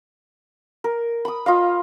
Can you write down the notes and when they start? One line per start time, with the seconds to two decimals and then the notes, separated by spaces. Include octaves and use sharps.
0.84 A#4
1.25 B5 D#6
1.46 F4 D#5 F5